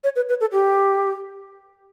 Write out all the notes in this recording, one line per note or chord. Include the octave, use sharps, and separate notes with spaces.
C#5
B4
B4
A4
G4